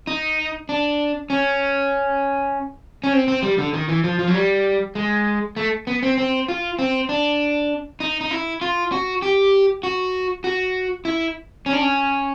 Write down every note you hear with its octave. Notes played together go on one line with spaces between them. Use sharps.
D#4
D4
C#4
C#4
C4
C4
G3
D3
D#3
E3
F3
F3
F#3
G3
G#3
A3
B3
C4
C4
F4
C4
D4
D#4
D#4
E4
F4
F#4
G4
F#4
F#4
E4
C#4
D4
C#4